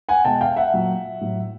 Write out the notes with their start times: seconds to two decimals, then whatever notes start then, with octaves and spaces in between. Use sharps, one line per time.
0.09 F#5 G#5
0.25 B2 G#3 G5 A5
0.41 F5 G5
0.56 E5 F#5
0.74 A#2 F#3
1.21 A2 F#3